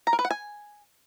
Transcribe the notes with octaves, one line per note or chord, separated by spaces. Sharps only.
A#5
A#4
B4
F#5
G#5